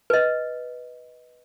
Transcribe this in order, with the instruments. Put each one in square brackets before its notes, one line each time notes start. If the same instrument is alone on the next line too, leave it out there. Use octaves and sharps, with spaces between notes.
[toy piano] B4 D#5